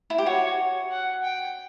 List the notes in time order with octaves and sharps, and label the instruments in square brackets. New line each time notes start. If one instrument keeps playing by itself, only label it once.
[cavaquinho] E4
G4
[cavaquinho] F#4 [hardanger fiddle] C#5
[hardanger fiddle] F#5
G5